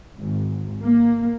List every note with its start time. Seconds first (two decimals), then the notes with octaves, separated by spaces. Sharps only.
0.19 G#1
0.83 A#3